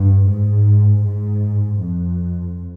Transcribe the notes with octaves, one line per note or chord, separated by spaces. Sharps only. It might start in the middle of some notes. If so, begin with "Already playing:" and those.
Already playing: G2
G#2
G#2
F2